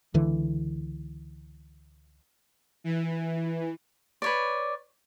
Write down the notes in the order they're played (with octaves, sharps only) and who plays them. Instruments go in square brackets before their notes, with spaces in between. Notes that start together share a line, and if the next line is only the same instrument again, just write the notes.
[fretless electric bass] C#2 D3 E3
[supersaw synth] E3
[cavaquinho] B4 C#5 D5